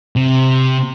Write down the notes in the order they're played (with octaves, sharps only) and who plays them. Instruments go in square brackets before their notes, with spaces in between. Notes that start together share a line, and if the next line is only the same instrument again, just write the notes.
[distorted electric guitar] C3